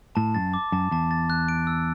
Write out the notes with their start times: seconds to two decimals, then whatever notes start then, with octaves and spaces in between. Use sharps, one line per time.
0.15 A2 A5
0.35 F#2 A6
0.54 D6
0.72 F#2 A5
0.91 E2 A5
1.11 A6
1.30 F#6
1.48 D7
1.67 E6